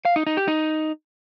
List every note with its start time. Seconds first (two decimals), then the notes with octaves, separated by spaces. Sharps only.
0.05 F5
0.16 D#4
0.27 D#4
0.37 G4
0.48 D#4